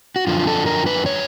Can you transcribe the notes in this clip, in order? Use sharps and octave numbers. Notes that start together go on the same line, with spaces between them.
F#4
F#2 D3 F3 F4
A4
A#4
B4
C#5